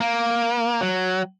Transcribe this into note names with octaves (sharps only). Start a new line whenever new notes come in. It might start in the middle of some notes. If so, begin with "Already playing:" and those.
A#3
F#3